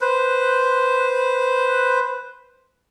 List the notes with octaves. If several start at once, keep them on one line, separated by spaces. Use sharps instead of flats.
B4 C5